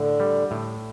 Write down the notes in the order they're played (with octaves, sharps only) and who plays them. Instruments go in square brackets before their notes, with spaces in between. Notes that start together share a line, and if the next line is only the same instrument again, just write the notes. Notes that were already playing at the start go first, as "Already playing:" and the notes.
Already playing: [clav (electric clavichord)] A2 [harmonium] D3
[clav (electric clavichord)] G3
A2